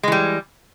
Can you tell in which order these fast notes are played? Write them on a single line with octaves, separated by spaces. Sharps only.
G#3 E3 G3